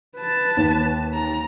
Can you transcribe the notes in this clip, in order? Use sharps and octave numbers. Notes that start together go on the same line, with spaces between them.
B4 A5
D#2
A#5